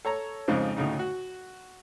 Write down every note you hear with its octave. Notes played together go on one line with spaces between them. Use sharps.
A4 C#5 A#5
F2 G#2 C#3 F3 C4
D2 A2 C#3 D#4
F#4